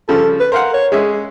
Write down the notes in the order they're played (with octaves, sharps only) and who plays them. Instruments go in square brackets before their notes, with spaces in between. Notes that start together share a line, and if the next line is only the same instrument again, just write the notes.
[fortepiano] C#3 F3 G3 [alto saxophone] A4
[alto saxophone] B4
[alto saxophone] A#4 [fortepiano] C5 F5 F#5
[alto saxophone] C#5
[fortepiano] G#3 C#4 E5 [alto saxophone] G#4